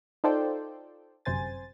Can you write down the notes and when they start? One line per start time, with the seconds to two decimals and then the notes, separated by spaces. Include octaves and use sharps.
0.24 D#4 F4 A4 C5 D5 G5
1.25 G1 F#2 C3 C5 G#5 A6